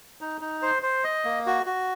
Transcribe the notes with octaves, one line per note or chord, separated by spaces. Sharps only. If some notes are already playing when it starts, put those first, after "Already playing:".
D#4
D#4
C5
C5
D#5
A#3
F#4
F#4